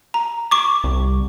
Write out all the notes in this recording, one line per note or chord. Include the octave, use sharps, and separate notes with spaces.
A#5
C#6 D6
C2